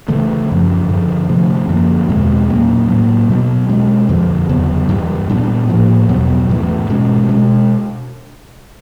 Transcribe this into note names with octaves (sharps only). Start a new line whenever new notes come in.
C#3 E3 A3
F#2 C#3 F3
G2 D3 F3
C3 F3 A3 D4
F#2 D3 F3 A#3
E2 B2 G#3 C4
A#2 F#3 A#3 C#4
A2 F#3 A#3
B2 F#3 B3
B2 G#3 C#4
F2 D3 F3
E2 C#3 F#3 B3
G2 E3 G3
A#2 G3 B3 D4
A2 F3 A#3
E2 B2 F#3 B3
G#2 E3 A3
B2 G#3 C#4
B2 G#3